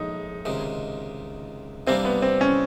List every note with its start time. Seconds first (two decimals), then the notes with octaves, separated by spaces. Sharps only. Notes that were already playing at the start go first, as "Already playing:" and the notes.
Already playing: A#1 A2 G#3 D#4
0.45 C#2 C3 D#3
1.87 C3 E3 G3 A#3 C4 D4
2.05 B3
2.22 C4
2.41 C#4